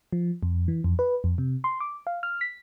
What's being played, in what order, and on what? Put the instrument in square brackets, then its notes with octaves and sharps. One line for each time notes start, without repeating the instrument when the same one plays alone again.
[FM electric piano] F3
F2
E3
F2
B4
F2
C3
C6
D6
F5
F6
B6